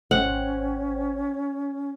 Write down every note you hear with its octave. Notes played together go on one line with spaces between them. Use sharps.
G#1 C#4 C5 F#5 G5